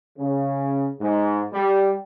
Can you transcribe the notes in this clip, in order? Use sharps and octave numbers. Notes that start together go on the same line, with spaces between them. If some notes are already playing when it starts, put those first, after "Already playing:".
C#3
G#2
G3